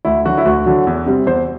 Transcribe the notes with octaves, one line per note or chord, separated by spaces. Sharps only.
D2 E4
D3 F#3 F#4
E4
D2 F#4
D3 F#3
E2
C3 G3
E2 C5